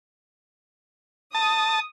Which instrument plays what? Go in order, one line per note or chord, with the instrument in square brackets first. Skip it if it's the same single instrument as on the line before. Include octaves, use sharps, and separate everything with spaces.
[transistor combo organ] A5 [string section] D#6